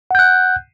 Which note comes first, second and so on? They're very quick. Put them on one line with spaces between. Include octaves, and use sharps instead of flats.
F#5 G6 F#6